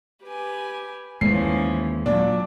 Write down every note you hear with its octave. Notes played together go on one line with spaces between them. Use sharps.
G4 B4 G#5
D#2 E3 F3 G#3 A3 C#4 C7
A#2 F#3 D4